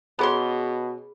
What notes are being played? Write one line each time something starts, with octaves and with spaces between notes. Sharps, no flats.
B2 B3 C#4 G#4 B5 C6